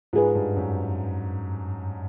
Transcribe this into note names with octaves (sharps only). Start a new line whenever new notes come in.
G#2 F4 G#4 B4
G2
F#2